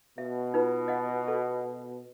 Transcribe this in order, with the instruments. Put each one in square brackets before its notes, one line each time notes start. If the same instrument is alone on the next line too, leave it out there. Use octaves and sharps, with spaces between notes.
[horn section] B2 [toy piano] E5
[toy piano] D#4 F4 B4
D#5 F#5
A4